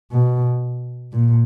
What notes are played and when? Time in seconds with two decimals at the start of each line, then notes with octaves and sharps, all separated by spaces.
0.12 B2
1.13 A#2